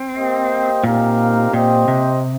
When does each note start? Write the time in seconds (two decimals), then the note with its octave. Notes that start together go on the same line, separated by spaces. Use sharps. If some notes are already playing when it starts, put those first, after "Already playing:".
Already playing: C4
0.14 A#3 G4 C5 D#5 G5
0.84 A#2 C4 D#4 G4 A#4 F5
1.53 A#2 C4 G4 C5 D#5 G5
1.88 C3